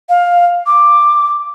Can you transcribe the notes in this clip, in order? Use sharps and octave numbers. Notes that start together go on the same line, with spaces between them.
F5
D6